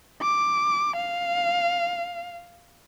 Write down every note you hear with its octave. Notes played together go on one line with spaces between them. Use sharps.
D6
F5